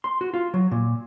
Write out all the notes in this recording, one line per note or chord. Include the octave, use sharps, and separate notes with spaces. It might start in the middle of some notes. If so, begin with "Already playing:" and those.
C6
F#4
F4
F#3
A#2